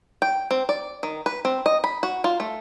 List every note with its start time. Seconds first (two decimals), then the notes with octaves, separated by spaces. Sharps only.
0.22 G5
0.51 C4
0.69 D5
1.03 D#3
1.26 B4
1.45 C4
1.66 D#5
1.84 B5
2.03 F#4
2.24 F4
2.40 A3